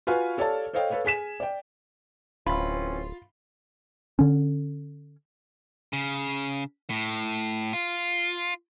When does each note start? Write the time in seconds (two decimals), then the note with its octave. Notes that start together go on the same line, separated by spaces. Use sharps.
0.07 F4 F#4 B4 F5 G#5 F6
0.37 G4 A4 C#5 D5 F5 A5
0.73 A4 C5 C#5 D#5 F5 G5
0.90 A4 B4 C#5 F5
1.05 G#4 G#5 B6 E7
1.40 D5 G5
2.47 D1 E3 C4 C#4 F4 B5
4.19 D3 C#4
5.93 C#3
6.90 A2
7.73 F4